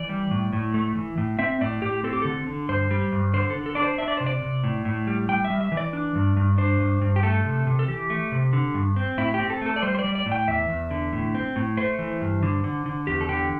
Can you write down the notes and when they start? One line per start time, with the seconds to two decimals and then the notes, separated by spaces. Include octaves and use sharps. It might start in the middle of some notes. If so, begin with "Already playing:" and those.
Already playing: E3 D5
0.09 G3
0.31 A2
0.53 A2
0.74 A3
0.95 E3
1.18 A2
1.39 C4 E5
1.61 A2 D5
1.82 A2 G4
2.04 C4 A4
2.13 G4
2.22 D3 A4
2.47 D3
2.69 G2 C5
2.91 G3
3.12 G2
3.34 D3 C5
3.50 A4
3.55 D3
3.66 A4
3.75 D4 D5
3.82 C5
3.98 D4 E5
4.08 D5
4.17 C3 C5
4.26 D5
4.42 C3
4.64 A2
4.85 A2
5.07 G3
5.29 G3 G5
5.45 E5
5.50 G3
5.61 E5
5.72 E3
5.77 D5
5.93 D4
6.15 G2
6.36 G2
6.58 D4 C5
6.80 G2
7.01 G2
7.16 G4
7.23 A3 A4
7.45 C3
7.67 C3
7.79 A4
7.88 E3 G4
8.10 A3
8.32 C3
8.53 D3
8.74 G2
8.96 C4
9.18 A2 E4
9.34 G4
9.40 C4
9.50 A4
9.61 A3 A4
9.76 D5
9.82 G3 C5
9.95 C5
9.99 D5
10.04 G3
10.15 D5
10.26 A2
10.32 G5
10.48 E2 E5
10.69 E2
10.91 D3
11.13 A2
11.35 C4
11.56 A2
11.77 A3 C5
11.99 E3
12.21 G2
12.43 D3
12.64 D3
12.86 D3
13.07 E2 G4
13.21 A4
13.29 D3 G4